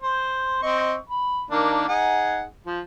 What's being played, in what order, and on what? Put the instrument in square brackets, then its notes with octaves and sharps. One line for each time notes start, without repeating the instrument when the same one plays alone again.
[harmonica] C5
C4 D#5 C#6
B5
D#3 A#3 D4
D#4 G#4 F#5
F3